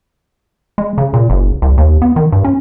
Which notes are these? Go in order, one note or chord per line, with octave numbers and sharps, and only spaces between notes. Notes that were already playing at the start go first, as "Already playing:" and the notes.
G#3
C#3
A#2
F#1
C2
D#2
B3
D#3
G2
C#4